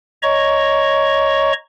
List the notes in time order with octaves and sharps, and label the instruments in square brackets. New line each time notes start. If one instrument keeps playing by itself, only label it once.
[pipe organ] C#5 D#5 A#5 C#6